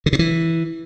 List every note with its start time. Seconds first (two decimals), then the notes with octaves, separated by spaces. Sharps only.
0.06 D3
0.13 B2
0.19 E3